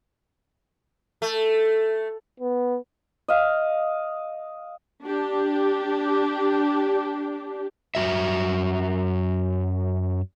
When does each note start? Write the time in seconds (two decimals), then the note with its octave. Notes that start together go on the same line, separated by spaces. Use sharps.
1.22 A3
2.40 B3
3.28 D#5 F5
5.02 D4 G4
7.95 F#2 D#3 F#4 E5